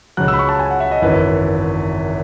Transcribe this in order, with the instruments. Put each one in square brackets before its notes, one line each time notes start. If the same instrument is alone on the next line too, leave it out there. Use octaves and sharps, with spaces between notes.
[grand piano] C#2 C#3 F#3 F#6
E6
B5
C#6
A5
G#5
F#5
E5
D#5
G#1 F#2 E3 B4